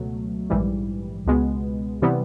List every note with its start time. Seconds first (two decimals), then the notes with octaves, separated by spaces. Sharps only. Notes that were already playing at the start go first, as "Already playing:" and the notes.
Already playing: C#2 B2 F#3 A3
0.50 A#1 G#2 E3 G3
1.26 C#2 B2 G#3 B3
2.02 C3 E3 G3 B3